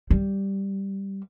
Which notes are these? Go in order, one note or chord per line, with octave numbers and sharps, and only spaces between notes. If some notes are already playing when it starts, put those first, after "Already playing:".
G3